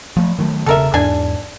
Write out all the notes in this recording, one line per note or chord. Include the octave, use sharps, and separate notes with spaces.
F3 A3
D#3 F#3 A3
E1 C#3 A4 A#4 E5
E2 G#2 D4 G#5